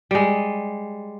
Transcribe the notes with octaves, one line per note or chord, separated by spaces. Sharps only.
G3 G#3